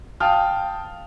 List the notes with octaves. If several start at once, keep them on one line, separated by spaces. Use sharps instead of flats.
F5 G5 A5 D#6 F6